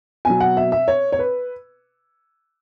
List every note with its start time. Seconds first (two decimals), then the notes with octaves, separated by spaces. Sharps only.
0.25 B2 F#3 G#5
0.41 F#5
0.57 E5
0.72 E5
0.88 C#5
1.12 C#5
1.19 B4